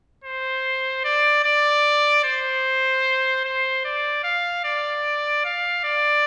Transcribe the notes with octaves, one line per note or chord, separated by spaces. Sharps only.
C5
D5
D5
C5
C5
D5
F5
D5
F5
D5